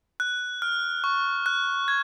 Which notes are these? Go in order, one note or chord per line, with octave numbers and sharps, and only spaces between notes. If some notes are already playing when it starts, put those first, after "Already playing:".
F#6
F6
C#6
F#6
G#6